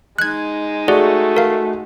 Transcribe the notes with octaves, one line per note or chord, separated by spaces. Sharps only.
G#3 D#4 F#6 G#6
A3 F#4 G#4 D5 F#5
A#4 F5